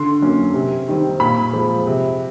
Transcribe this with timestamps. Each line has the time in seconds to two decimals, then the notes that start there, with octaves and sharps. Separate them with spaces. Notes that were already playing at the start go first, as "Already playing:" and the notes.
Already playing: D3 C6
0.22 F#3 A#3 C#4
0.54 C3
0.88 D#3 G3 C4
1.20 A#2 B5
1.53 F3 G#3 C4
1.87 C3